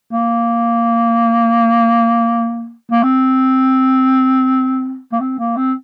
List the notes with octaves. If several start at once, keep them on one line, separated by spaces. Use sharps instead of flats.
A#3
A#3
C4
A#3
C4
A#3
C4